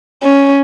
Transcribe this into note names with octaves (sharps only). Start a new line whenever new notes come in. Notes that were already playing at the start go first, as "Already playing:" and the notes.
C#4